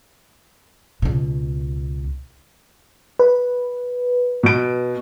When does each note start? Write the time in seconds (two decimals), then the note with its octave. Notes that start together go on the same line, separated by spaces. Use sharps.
1.02 C#2 B2
3.19 B4
4.43 B2 D7